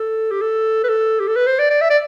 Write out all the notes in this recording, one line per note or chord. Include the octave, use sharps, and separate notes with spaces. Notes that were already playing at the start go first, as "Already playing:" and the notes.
Already playing: A4
G4
A4
B4
A4
G4
A4
B4
C5
D5
D5
E5
D5